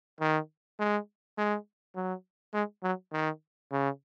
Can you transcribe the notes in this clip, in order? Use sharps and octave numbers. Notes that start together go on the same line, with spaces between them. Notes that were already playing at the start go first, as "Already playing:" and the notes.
D#3
G#3
G#3
F#3
G#3
F#3
D#3
C#3